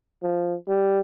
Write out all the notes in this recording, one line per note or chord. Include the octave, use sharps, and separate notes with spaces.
F3
G3